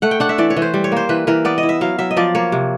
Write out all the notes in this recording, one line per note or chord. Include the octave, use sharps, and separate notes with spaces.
A3 F#5
G5
D4 F#5
E5
E3 D5
C#5
E3
C5
G3
C#5
A#3 C5
E3 B4
E3 A#4
B3 D5
D#5
E4
E5
F#3 F5
F#3 E5
D#5
F3 D5
A#3 C#5
C3